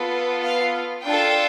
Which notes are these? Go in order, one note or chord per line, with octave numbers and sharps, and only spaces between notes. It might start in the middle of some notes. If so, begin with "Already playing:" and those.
Already playing: B3 F4 A4
F5
D4 F4 A4 G5